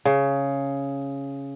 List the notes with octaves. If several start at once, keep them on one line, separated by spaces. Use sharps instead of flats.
C#3